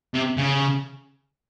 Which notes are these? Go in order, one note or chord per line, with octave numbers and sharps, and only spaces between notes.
C3
C#3